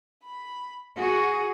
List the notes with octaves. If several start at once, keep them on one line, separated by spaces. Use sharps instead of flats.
B5
F#4 G#4